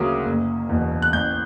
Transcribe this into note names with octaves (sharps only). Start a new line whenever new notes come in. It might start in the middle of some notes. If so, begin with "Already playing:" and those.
Already playing: D2 C#3 F#3 A#3 D6 D#6
F#1
E2 B2
F#6
A1 G6